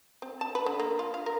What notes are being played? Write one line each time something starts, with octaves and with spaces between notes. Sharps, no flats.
C4
A5
B4
D3
A#3
F4
F5
A#4